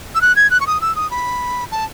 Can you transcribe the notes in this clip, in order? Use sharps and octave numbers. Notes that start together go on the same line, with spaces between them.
E6
F#6
G#6
F#6
C#6
D#6
E6
D#6
B5
A5